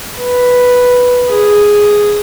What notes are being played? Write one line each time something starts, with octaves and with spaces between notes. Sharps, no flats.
B4
G#4